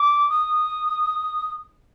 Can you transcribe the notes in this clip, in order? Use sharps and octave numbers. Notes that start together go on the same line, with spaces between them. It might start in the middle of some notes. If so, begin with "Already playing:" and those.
Already playing: D6
D#6